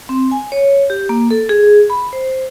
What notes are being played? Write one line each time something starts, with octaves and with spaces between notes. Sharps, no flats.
C4
G#5
C#5
G4
A#3
A4
G#4
B5
C5